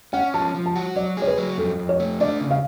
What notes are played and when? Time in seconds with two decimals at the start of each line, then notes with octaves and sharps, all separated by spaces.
0.13 C#4 F#5
0.34 F3 A5
0.55 F3
0.66 A5
0.76 F#4
0.96 F#3 D5
1.17 G#4 C#5
1.27 B4
1.38 F#3
1.58 F2 A4
1.79 F2
1.89 C#5
2.00 A3
2.20 D4 D5
2.41 C#3
2.51 F5